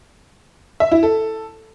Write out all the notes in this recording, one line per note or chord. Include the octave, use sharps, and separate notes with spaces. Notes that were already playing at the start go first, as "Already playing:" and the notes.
E5
E4
A4